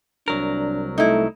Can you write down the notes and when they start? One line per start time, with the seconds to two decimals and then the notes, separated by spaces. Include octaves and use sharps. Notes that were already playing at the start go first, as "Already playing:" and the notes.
0.28 C2 F#3 D4 A#4
0.98 A3 D#4 E4